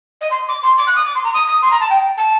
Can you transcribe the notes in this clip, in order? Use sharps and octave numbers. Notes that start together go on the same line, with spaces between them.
D#5
C6
D6
C6
D6
F#6
D#6
D6
C6
A#5
D#6
D#6
C6
A#5
A5
G5
A5